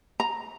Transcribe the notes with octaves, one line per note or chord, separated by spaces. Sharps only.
A#5